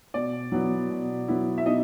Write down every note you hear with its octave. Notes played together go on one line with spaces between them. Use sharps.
B2 D5
F#3 B3 E4
B2
F#3 B3 E4
E5
B2 D#4 D#5